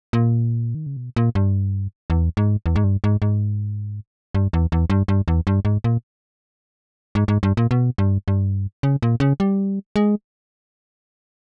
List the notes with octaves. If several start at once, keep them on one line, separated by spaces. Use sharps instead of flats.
A#2
D#3
C#3
B2
A#2
G2
E2
G#2
E2
G#2
G2
G#2
G#2
G2
E2
E2
G2
G2
E2
G2
G#2
A#2
G#2
G#2
G2
A#2
B2
G2
G2
C#3
A#2
C#3
G3
G#3